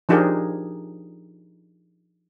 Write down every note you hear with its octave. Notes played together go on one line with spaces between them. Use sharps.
F3 D4 D#4 G4 G#4 A#4